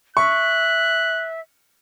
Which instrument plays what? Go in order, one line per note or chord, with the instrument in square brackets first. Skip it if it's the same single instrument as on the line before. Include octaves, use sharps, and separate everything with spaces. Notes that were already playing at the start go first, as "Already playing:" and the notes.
[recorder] E5 [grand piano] C#6 [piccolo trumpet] F#6